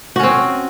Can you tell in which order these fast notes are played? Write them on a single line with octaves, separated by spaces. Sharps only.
F#4 C#4 C4